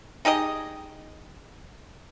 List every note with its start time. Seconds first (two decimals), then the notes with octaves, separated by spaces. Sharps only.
0.25 D#4 G4 G#4 D#5